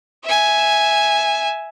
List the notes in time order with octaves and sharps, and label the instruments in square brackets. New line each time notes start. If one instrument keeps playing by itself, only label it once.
[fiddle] E5 G#5